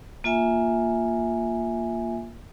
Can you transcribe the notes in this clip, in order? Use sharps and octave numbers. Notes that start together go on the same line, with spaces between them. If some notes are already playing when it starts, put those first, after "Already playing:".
A#3 F4 E5 G#5